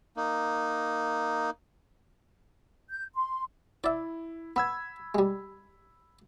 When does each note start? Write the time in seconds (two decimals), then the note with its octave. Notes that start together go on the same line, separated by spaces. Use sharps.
0.17 A#3 D#4
2.90 G6
3.15 C6
3.84 E4 D5 E5
4.56 B3 B5 E6 G#6
5.15 G3 G#3